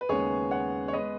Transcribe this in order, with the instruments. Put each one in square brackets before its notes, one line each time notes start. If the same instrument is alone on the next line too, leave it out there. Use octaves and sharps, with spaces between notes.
[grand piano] B4
D#2 C#3 G#3 B3 G#4 C#5
C#5 F#5
C#5
G#3 B3 B4 D#5